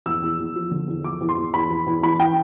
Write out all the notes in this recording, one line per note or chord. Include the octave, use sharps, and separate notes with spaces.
E2 E6
E2
E2
F3
D3
E2
F3 D6
E2
C6
E2
E2 B5
E2
E2
E3 B5
E3 G5